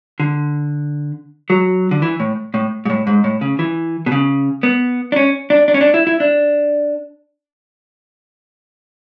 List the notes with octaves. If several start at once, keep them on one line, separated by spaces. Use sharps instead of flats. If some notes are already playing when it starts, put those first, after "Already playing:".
D3
F#3
D3
E3
A2
A2
G#2
A2
G#2
A2
C#3
E3
B2
C#3
B3
D4
C#4
D4
D4
C#4
D4
E4
E4
D4